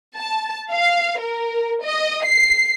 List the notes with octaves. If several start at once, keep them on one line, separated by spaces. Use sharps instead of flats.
A5
F5
A#4
D#5
C7